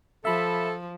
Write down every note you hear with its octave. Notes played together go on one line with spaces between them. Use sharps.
F3 A4 E5 B5